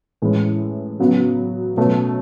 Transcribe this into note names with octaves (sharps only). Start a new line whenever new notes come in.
A2 E3 G#3 C#4 E4
C#3 F#3 B3
B2 F#3 A3 C#4